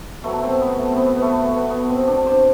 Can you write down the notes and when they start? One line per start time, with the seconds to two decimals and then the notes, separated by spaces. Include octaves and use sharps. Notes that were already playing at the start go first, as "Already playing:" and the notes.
0.24 B2 F#3 A3
0.43 C4
0.61 B3
0.78 A3
0.92 B3 C4
1.17 A3 B3
1.46 A3
1.70 B3
1.89 C4
2.08 D4
2.26 C5